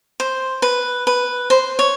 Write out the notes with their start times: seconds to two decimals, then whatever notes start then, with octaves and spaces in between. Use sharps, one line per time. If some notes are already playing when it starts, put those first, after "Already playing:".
0.20 C5
0.62 B4
1.07 B4
1.50 C5
1.79 C#5